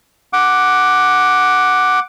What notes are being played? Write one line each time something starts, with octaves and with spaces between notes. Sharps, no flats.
F#5 D6